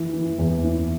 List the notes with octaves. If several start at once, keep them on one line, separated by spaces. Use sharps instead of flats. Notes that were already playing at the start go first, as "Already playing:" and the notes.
Already playing: E3
E3
E2
E3